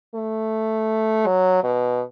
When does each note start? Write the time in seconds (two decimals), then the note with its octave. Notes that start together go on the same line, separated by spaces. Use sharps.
0.15 A3
1.26 F#3
1.63 B2